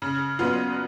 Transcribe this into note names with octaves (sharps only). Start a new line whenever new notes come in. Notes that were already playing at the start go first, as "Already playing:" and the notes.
C#3
F#3 B3 F4